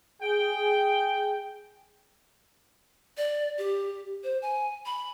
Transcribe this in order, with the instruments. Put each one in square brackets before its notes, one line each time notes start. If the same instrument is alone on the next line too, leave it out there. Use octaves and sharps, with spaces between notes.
[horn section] G#4 G5
[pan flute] D5
G4
C5
G#5
B5